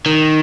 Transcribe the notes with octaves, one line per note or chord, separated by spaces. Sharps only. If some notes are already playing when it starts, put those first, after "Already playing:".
D#3